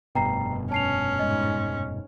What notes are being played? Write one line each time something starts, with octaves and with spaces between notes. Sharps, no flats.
F1 G2 B2 G5 A#5 C7
C#4 A5 C7 F7
G#2 D#5